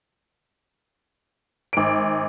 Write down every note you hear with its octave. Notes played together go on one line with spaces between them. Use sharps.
G#1 D7